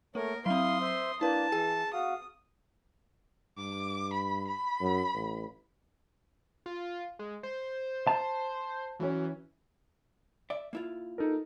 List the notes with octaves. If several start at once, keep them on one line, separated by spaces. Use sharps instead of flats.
A3 A#3 A#4 C#5
F#3 C4 E4 F5 C6 D#6
C5 E5
A#3 D4 E4 B4 A5
E3 G#4 G#5
F#4 F5 D#6
G2 D6
B5
B5
F#2
A1
F4
G#3
C5
A5
E3 F#3 C#4
D5 E5
A#3 E4 F4
D#4 A4 A#4